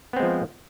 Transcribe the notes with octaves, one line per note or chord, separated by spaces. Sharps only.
F3 G#3 B3 C4